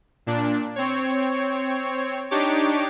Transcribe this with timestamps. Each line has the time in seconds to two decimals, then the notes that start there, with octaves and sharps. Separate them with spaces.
0.26 A#2 D4
0.76 C4 C#5
2.31 D4 D#4 G4 C#5 D6